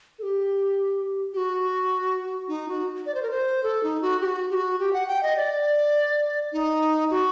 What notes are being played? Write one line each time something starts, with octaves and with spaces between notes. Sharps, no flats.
A4
G4
G4
F#4
D#4
F#4
D5
C5
A#4
C5
A4
D#4
F#4
G4
F#4
G4
F#4
G4
F#5
G5
D#5
D5
D#4
F#4